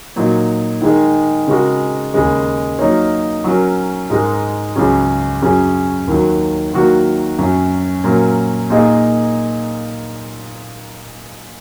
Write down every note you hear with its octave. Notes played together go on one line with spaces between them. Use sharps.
A#2 F#3 D#4
D#3 G#3 D#4 G#4
C#3 G#3 F#4 A#4
D#2 C#3 G#3
F#3 A#3 D#4 A#4 C#5
F#3 C#4 A#4
G#2 G#3 D#4 A#4
C#2 C#3 F#3 C#4 G#4
F#2 F#3 C#4 G#4
D#2 D#3 F#3
D#3 F#3 A#3 F#4
F#2 F#3 C#4
A#2 F#3 C#4 A#4
A#2 A#3 D#4 G#4 D#5